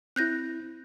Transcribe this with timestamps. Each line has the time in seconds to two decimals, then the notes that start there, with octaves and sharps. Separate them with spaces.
0.16 C4 E4 F#6 G6 A#6